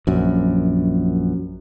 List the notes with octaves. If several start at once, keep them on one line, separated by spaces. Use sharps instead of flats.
A#1 F#2